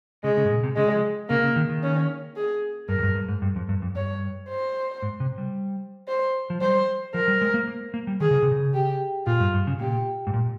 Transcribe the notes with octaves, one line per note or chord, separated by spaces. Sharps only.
C#3 G#3
C#3
G#2
A#2
C3
C#3 G#3
F3
C#3 A#3
C#3
D#3
D#3
C#4
G#4
G2 A#4
F2
G2
G2
G#2
G2
F2
G2
F2
G2 C#5
C5
G#2
C3
G3
C5
F3
G3 C5
F3 A#4
G3
G#3
A#3
A#3
A#3
G3
D#3 G#4
C#3
C3
C#3
G4
A#2 F4
G2
G2
C#3
A#2 G4
G#2
A#2